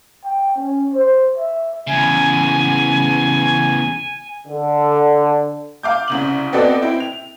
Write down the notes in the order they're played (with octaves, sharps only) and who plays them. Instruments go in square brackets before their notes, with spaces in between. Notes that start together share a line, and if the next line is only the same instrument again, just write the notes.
[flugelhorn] G5
C#4
C5
E5
[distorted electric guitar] E2 C#3 [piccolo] G#5
[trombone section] D3
[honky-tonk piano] F5 D6 G6
C2 C#3 F#7
B3 C4 F#4 A4 D5 D#5
C4 E4 G5
F7